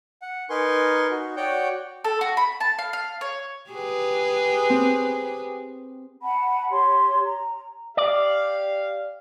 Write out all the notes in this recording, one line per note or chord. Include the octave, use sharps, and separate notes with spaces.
F#5
D#4 A#4 B4 G#5 C6 C#6
D#4 F#4
F#4 C#5 D5 F#5 G5 G6
A4
F#4
B5
A5
F5
F5
C#5
G4 G#4 B4
C4
F#5 A5 B5
G4 C#5 C6
A#5
G4 D5 F5